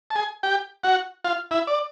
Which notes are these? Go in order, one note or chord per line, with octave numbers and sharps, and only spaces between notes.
A5
G#4 G#5
G4 G5
F#4 F#5
F4 F5
E4 E5
D5